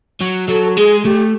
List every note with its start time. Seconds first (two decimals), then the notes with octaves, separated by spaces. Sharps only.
0.21 F#3
0.48 F#3 A4
0.76 G#3 G#4
1.05 A3 G4